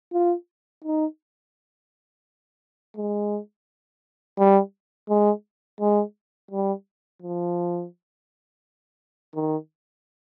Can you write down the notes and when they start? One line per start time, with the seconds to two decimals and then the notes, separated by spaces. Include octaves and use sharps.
0.13 F4
0.84 D#4
2.97 G#3
4.38 G3
5.09 G#3
5.81 G#3
6.51 G3
7.22 F3
9.34 D#3